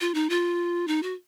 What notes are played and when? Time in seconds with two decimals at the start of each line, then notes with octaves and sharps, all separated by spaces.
0.01 F4
0.14 D#4
0.30 F4
0.88 D#4
1.03 F#4